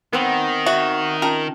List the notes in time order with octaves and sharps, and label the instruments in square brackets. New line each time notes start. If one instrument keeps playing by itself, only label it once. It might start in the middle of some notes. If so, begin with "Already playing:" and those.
[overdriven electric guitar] D#3 [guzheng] B3 C4
[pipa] F#4 [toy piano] E5
[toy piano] C#4 F4 A5 [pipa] A#4